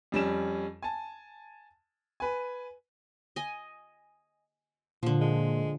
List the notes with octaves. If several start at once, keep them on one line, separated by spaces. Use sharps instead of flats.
F2 G3 C#4 E7
G#5 A5
B4 G#5
D#5 G#5
A#2 D3 F3
G#3